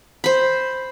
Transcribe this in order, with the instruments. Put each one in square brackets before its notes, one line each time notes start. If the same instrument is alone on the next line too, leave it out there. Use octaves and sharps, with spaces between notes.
[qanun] C5 B5